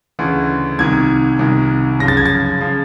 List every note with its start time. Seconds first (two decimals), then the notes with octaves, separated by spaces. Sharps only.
0.19 D2 C#3 E3
0.79 C2 C3 D#3 G#6
1.39 C2 C3 D#3
1.99 F#2 C#3 F3 A#6
2.08 A6
2.17 G#6
2.26 A6
2.61 C#3 F3